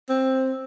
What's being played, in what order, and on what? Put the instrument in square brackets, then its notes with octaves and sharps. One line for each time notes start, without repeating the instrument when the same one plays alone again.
[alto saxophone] C4